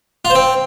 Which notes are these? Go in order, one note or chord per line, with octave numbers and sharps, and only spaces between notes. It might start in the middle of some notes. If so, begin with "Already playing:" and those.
F4
C5
C4